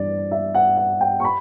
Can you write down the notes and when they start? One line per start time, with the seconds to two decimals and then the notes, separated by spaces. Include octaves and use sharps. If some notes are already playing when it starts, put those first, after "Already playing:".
Already playing: G2 E3 D5
0.31 E5
0.55 F#5
0.77 F#5
1.01 G5
1.20 C#6
1.25 B5